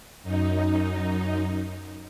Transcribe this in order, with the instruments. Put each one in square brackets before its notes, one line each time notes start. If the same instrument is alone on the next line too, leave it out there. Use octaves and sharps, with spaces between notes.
[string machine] F#2 D#4